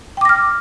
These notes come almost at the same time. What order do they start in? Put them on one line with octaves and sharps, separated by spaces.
G5 D6 A#6 F6